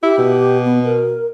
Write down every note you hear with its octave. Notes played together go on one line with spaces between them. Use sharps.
E4 G4
B2
B3
A#4